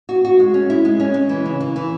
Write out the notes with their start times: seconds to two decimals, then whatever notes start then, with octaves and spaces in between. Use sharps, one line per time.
0.09 F#4
0.25 F#4
0.40 G#3
0.54 C#4
0.70 E4
0.85 G#3
1.00 C#4
1.14 G#3
1.29 E3
1.46 C#3
1.60 E3
1.76 E3